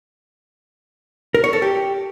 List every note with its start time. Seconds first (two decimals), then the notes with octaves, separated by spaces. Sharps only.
1.35 A#4
1.44 C#5
1.53 A4
1.62 G4